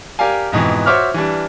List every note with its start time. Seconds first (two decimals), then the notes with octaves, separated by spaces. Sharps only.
0.19 G4 A#4 D5 F5 G#5
0.52 F2 G#2 B2 E3
0.86 F#4 C5 C#5 E5 D6 F6
1.14 E3 G3 D4